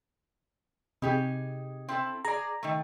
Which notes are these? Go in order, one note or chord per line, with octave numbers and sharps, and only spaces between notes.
C3 D#4 G4 G#4
C4 E4 A4
G#4 D5 A#5
D#3 A3